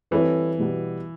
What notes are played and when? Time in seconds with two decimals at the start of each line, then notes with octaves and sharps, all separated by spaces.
0.11 E3 G3 C4 E4 A4 C#5
0.58 B2 G3 B3